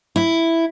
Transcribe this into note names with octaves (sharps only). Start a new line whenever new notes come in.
E4